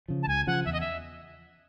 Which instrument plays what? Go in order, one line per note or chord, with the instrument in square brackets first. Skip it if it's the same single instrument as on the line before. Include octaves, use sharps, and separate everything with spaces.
[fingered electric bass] C#3 F3
[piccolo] A5
[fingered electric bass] C#2 [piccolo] G#5
[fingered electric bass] C#3 F3 [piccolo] F#5
[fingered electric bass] E2 [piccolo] E5
[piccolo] D#5
E5